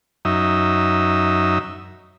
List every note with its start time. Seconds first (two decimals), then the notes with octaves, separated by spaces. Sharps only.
0.25 F#2 D#4 E5